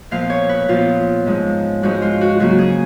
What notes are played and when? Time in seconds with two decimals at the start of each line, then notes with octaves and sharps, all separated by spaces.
0.11 A#2 F3 B3 F5
0.30 C#5
0.49 B4
0.68 A#2 F3 B3 F4
1.26 G#2 F3 G#3
1.83 G#2 F3 G#3 F#4
2.02 F4
2.21 F#4
2.40 C#3 F#3 A#3 F#4
2.59 G#4